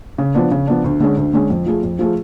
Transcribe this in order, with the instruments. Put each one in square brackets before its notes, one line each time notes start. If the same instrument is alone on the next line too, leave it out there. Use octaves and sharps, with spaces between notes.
[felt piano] C#3
F3 B3 D4
C#3
F3 B3 D4
D2
D3 G#3 C#4
D2
D3 G#3 C#4
F2
F3 A3 F4 G#4
F2
F3 A3 F4 G#4